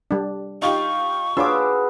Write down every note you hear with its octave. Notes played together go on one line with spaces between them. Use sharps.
G3 D4
D#4 F4 G4 C#6
D4 F4 F#4 G#4 B4 C#5 D6 E6